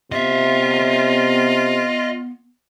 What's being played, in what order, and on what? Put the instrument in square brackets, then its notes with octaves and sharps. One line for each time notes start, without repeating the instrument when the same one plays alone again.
[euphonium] C3 [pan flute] B3 [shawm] F4 [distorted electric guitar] D#5 E5